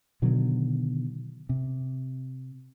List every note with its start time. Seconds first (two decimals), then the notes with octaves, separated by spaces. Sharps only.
0.22 B2 D3 D#3 F#3
1.49 C3